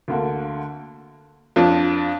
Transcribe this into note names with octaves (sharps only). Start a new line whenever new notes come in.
D2 D3 A#3
F2 F3 D4 F4